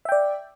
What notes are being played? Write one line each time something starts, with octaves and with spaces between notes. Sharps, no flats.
D5 E5 G5